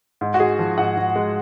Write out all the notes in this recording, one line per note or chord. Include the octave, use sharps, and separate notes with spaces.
G#2
F#4
G#3 G#4
F3
G#2 F#5
G#2
G#3